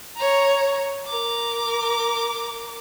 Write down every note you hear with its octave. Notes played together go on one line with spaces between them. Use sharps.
C#5 A#5
A#4 D6